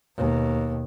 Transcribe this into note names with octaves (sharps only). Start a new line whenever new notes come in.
D#2 B2